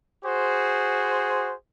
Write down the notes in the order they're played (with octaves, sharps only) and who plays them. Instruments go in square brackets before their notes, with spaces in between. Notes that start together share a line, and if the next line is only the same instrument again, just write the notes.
[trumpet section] F#4 G#4 C5